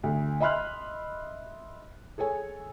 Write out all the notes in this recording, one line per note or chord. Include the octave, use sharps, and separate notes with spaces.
D2
D#5 E5 B5 C6 F6 F#6
G#4 A4 C#5 G#5